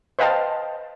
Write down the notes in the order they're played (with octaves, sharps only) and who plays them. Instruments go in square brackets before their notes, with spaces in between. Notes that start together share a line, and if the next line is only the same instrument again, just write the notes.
[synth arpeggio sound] B4 C5 D#5 F5 G5 A5